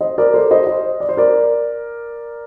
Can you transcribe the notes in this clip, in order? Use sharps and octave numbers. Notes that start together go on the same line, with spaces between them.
C5 D#5
A#4 D5
A4 C5
C5 D#5
C5 D#5
D5
C5
A#4 D5